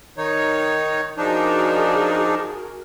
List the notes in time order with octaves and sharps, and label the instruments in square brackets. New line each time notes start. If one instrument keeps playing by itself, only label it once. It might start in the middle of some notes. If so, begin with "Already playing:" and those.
[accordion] D#3 D#4 C#5
[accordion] F3 D4 D#4 [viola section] F#4 G#4 A#4